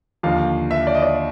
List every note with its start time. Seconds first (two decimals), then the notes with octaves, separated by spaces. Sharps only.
0.23 D#2 D3 F3 F5
0.71 E5
0.87 D5
0.95 D#5
1.02 D5